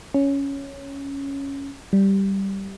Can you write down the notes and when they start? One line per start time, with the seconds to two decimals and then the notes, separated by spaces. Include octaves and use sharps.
0.14 C#4
1.93 G3